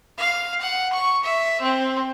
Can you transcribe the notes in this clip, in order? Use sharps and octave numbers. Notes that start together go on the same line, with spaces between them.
F5
F#5
C#6
E5
C4